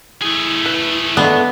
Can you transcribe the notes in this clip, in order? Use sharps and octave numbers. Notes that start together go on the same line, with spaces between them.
A3 E4 G#4
B4
G#3 A3 B3 D4 A4